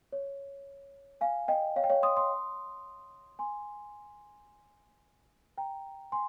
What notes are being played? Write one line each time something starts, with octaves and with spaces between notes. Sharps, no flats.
C#5
F5 G#5
D#5 G5
C#5 F5
G5
C#5 F5
C6 D#6
C6 D#6
G#5 C6
G5 A#5
G#5 C6